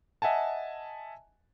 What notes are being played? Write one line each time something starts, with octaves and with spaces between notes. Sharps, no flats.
D#5 E5 F#5 G#5 A5